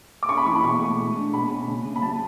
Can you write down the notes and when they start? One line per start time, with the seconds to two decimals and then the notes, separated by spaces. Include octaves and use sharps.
0.23 D6
0.29 C#4 C#6
0.37 B5
0.46 E3 C#6
0.55 B5
0.63 B2 C#6
0.81 A3
0.98 G#3
1.16 D4
1.33 B2 B5
1.51 C#4
1.68 C#3
1.85 C#3
1.96 B5
2.02 F#3 A5